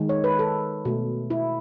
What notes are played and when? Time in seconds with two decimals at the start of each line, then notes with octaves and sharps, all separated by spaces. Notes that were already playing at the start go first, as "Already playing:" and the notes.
Already playing: D#3 G#3
0.09 C#5
0.24 B4
0.39 A4
0.85 B2 A3
1.30 E4